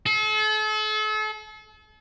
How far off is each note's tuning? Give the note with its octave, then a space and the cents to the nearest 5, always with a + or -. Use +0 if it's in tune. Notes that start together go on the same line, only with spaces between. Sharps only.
A4 -40